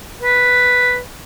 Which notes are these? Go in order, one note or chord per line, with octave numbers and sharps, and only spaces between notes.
B4